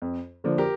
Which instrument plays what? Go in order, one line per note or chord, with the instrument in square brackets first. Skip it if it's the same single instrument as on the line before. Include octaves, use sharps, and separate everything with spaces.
[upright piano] F2
D3 F3 A#3 D4
[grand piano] G4 A#4